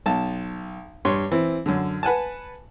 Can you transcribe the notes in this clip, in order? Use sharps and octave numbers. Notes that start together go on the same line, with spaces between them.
B1 A5
G2 C#5 C6
E3 C4
F#2 D3
B4 F#5 G#5 A5